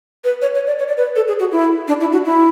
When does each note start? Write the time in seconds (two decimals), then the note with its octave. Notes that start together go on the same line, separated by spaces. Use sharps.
0.24 B4
0.42 C#5
0.55 C#5
0.67 D5
0.79 C#5
0.88 D5
0.97 B4
1.16 A4
1.28 G#4
1.39 F#4
1.52 E4
1.88 D4
2.00 E4
2.12 F#4
2.25 E4